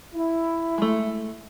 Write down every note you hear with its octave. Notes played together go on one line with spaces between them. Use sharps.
E4
G#3 A3